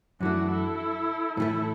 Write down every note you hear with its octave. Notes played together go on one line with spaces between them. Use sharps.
F#2 E3 A3 D4 F#4
E4 A4
A2 E3 A3 E4 A4